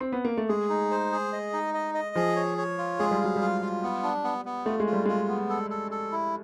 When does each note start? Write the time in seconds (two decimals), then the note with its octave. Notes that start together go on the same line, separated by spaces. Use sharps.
0.01 C4
0.12 B3
0.25 A#3
0.37 A3
0.49 G#3 G#4
0.69 D#4
0.91 C5
1.12 G#4
1.33 D#5
1.53 D#4
1.74 D#5
1.95 D#5
2.16 F3 G#4
2.36 C#5
2.58 C#5
2.78 F4
2.99 G#3 G#4
3.11 G3
3.21 F#3 F5
3.36 G3
3.41 F4
3.62 F4
3.83 B3
4.03 D4
4.24 B3
4.45 B3
4.65 A3 F4
4.80 G#3
4.86 F4
4.93 G3
5.05 G#3 F4
5.28 B3
5.50 A4
5.70 A4
5.91 A4
6.12 E4